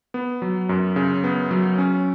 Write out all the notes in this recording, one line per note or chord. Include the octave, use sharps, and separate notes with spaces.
B3
F#3
F#2
C#3
B3
F#3
C#4